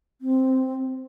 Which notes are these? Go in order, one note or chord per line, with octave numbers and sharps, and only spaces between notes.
C4